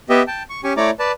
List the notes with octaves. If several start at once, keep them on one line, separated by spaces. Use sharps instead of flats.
B3 G4 D#5 E5
G5 A5
C#6
C#4 G4 G#5 C#6
A3 E4 C#5 D5 A#5 D6
B4 D5 A5